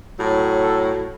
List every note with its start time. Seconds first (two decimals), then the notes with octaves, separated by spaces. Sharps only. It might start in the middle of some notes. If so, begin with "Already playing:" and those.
0.19 A2 F#3
0.62 A4